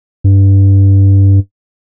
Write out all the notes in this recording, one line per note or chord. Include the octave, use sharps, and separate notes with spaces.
G2